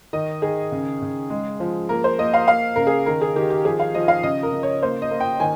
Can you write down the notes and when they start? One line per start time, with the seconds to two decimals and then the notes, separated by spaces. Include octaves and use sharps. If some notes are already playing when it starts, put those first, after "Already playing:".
0.13 D#3 D#5
0.42 D#3 G#4
0.72 C#3
1.02 C#3
1.30 G#3
1.60 F3
1.89 A#3 A#4
2.04 C5
2.19 A#3 D#5
2.34 F5
2.47 A#3 F5
2.76 C#3 A#4
2.87 G#4
3.06 D#3 A#4
3.21 G#4
3.36 D#3 G4
3.50 G4
3.65 F3 G#4
3.80 F5
3.94 F3 D#5
4.08 F5
4.23 C#3 D#5
4.43 A#4
4.53 C#3
4.63 C#5
4.82 A#3 C5
5.02 D#5
5.11 A#3
5.20 G5
5.40 D#3 G#5